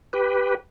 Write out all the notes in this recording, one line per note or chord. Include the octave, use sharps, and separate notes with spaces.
G4 B4